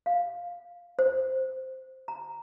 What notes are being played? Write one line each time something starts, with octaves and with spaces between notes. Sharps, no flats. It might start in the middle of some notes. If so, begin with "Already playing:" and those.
F5
C5
A#5